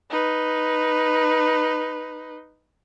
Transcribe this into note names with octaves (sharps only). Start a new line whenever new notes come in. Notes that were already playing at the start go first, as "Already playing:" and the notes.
D#4 B4